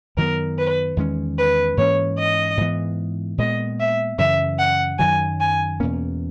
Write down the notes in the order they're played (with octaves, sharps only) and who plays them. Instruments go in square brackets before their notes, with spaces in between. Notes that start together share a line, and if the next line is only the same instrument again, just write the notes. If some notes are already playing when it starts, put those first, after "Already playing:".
[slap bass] F#2 D#3 F#3 B3 [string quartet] A#4
[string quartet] B4
[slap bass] E2 D#3 G#3 C#4
[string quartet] B4
[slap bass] G#2 E3 A#3 C#4 [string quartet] C#5
[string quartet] D#5
[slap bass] G#2 E3 B3
[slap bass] A#2 G#3 B3 [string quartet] D#5
[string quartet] E5
[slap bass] F#2 C#3 E3 [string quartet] E5
[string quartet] F#5
[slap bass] F#2 D#3 F#3 [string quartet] G#5
[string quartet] G#5
[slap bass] E2 B2 A#3 C#4